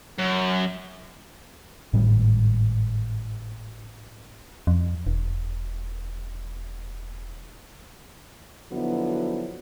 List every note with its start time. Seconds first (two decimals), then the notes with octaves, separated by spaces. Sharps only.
0.19 F#2
1.93 G#1 A2 G3
4.67 F2
5.07 E1
8.71 D3 F3 F#3 B3 E4 F#4